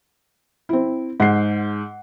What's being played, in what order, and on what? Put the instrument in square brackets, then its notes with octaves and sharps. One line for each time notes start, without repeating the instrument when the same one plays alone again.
[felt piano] C4 E4
[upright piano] G#2 [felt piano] F#5 C7